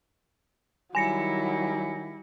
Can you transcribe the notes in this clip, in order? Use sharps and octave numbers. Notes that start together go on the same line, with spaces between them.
D#3 F#3 G3 E4 G#5 A#6 C#7